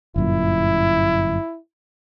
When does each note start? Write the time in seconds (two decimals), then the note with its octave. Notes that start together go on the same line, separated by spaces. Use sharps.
0.16 G1 F#2 A#2 E4